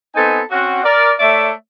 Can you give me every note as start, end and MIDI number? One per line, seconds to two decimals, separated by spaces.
0.15 0.40 59
0.15 0.40 60
0.15 0.40 63
0.15 0.40 69
0.15 0.40 80
0.51 0.81 60
0.51 0.81 61
0.51 0.81 66
0.84 1.12 70
0.84 1.12 74
1.19 1.49 57
1.19 1.49 73
1.19 1.49 74
1.19 1.49 76